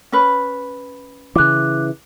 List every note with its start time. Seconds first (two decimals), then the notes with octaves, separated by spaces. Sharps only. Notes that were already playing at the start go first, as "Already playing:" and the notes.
0.12 C#4 B4
1.36 C#3 E3 D6 F#6